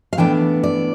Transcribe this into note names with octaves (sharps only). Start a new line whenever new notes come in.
F5
A2 E3 B3 D4 G5
D5